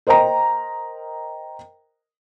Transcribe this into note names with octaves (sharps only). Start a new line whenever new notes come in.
A#4 C5 D#5 G5 A#5